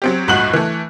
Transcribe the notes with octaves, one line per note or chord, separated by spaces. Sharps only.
F#3 C4 G4
G1 C#2 A2 F#4 F#6 F#7
E3 A3